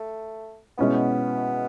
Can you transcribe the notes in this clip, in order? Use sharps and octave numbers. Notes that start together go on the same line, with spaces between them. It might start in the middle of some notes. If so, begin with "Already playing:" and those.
Already playing: A3
B2 G#3 B3 C#4 E4